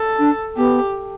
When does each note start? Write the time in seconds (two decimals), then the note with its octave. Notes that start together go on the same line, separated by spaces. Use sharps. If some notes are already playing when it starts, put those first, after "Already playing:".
Already playing: A4
0.19 D4
0.57 B3 G4